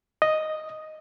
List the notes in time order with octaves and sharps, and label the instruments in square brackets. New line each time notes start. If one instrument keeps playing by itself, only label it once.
[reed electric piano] D#5